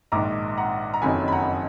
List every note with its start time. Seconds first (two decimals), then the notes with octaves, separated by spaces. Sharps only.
0.12 A#1 G#2 D#3 A#5 D6
0.57 F#5 A#5
0.94 A#5
1.02 F#1 F2 D#3 F#3 G#5 B5
1.28 B5
1.32 F#5 A#5